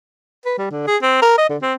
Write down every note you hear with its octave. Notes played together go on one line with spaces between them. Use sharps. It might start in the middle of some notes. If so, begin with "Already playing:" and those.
B4
G3
D3
G#4
C4
A#4
D#5
D3
C4